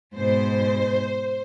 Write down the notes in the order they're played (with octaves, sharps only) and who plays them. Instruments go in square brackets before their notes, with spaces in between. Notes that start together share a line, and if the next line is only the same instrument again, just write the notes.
[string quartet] G#2 B2 [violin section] C5